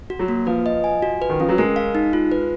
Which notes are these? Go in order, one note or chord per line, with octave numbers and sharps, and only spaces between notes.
F#4
F#3
A#3
F3 B4
D#5
G#5
F#4
B4
D#3
F3 C#4
F#3
G#3 A#4
F5
D#4
F4
B4